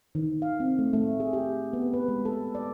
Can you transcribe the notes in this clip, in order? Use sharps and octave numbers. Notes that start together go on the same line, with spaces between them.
D#3
F5
C4
A3
A3
G#4
G4
B3
B4
G#3
A4
D5